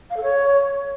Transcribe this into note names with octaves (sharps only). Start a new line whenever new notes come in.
F5
A4
C#5